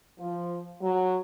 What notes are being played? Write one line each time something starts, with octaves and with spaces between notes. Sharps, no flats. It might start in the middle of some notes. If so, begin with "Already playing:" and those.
F3
F#3